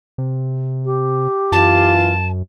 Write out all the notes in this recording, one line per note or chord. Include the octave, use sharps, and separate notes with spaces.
C3
G4
F#2 E3 F4 A5